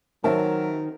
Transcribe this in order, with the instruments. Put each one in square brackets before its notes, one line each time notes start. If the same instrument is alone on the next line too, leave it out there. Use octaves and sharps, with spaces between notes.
[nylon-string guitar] D#3 C4 [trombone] F#3 [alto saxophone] A#4 [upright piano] C#5 E5 A5